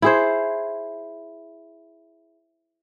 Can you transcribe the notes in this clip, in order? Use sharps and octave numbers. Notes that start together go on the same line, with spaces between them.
E4 G#4 C5